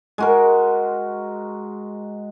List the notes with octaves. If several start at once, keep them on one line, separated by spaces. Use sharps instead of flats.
G#3 F#4 A#4